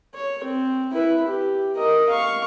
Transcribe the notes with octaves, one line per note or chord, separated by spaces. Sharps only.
C#5
C4
E4 B4
G4
A#4 D#5
F5 C#6